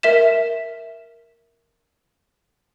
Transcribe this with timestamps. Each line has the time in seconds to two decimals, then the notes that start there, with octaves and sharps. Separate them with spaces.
0.03 A#4 E5 B6 E7